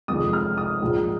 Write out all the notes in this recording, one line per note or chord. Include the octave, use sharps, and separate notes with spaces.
F1 F2 D#3 G#3 D#6
F6
D#6
A#1 G#2 G#3